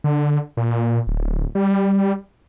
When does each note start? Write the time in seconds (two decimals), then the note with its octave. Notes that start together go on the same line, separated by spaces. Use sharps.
0.04 D3
0.57 A#2
1.07 D1
1.55 G3